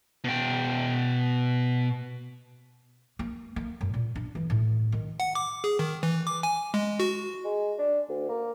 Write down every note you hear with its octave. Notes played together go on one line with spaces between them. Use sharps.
B2 G5
A#3
A#3
F#2
A#2
D4
E3
A2
D#3
F#5
D6
G#4
D#3
E3
D6
G#5
G#3
F#4
G#3
D4
D2
A#3